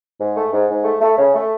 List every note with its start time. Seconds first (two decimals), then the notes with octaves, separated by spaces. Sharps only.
0.19 G#2
0.35 A3
0.52 G#2
0.68 G#2
0.84 A3
1.00 A3
1.17 C#3
1.34 A3